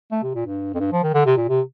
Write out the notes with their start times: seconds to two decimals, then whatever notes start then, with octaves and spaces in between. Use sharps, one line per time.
0.12 A3
0.23 C3
0.35 A#2
0.47 G2
0.74 F2
0.80 G2
0.92 F3
1.03 D#3
1.14 D3
1.26 C3
1.37 A#2
1.49 C3